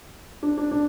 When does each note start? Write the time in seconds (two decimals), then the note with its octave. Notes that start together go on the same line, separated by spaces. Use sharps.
0.43 D4
0.58 D4
0.71 D4